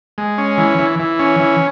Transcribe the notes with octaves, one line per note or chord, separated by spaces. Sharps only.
G#3
C#4
E3
E3
E3
C#4
E3